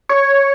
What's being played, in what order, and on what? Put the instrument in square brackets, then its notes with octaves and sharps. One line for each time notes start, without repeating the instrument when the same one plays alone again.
[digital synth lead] C#5